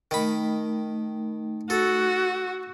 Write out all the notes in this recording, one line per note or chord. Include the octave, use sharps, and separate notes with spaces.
D#3 A3 D#4 B5
F#4 A4